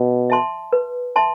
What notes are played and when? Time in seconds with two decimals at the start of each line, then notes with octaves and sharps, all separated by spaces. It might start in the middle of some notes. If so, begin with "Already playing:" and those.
Already playing: B2
0.30 E5 A5 C6
0.73 B4
1.16 E5 A5 C6